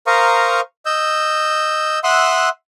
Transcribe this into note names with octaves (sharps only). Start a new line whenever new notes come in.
A#4 C5 F5 A#5 C#6 D#6
D#5 E6 G6
E5 F#5 C6 D#6 E6 F#6